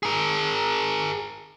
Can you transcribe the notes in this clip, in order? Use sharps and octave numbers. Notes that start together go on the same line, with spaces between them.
G#4 A#4